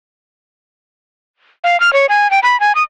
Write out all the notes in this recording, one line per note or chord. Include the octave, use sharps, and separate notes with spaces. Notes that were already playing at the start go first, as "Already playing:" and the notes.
F5
F6
C#5
G#5
G5
B5
G#5
D#6